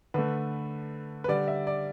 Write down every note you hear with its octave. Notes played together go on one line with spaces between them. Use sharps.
D3 A3 B4
B4
D3 G3 D5
E5
D5